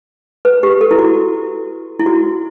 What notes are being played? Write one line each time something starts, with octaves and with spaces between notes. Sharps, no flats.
B4
G4
A4
E4
F#4
E4
F#4